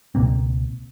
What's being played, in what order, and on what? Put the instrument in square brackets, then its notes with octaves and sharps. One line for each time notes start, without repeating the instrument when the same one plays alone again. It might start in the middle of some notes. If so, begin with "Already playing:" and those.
[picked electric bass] C#2 B2 A#3 C4